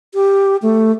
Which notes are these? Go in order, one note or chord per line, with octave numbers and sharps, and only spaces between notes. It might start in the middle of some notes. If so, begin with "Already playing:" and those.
G4
A3